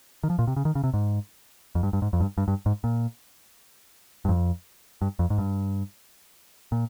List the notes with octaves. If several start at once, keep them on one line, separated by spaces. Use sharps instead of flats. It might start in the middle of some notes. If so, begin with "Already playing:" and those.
D#3
F3
A#2
C3
C#3
D#3
C#3
C3
G#2
F2
G2
G2
G#2
F2
G2
G2
G2
G#2
A#2
G2
F2
G2
F2
G#2
G2
A#2